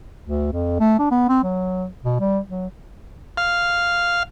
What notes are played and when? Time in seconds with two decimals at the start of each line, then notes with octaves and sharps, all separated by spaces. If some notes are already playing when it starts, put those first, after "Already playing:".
0.24 D2
0.53 F2
0.79 A3
0.99 D4
1.11 B3
1.29 C4
1.43 F#3
2.04 B2
2.20 G3
2.48 F#3
3.37 F5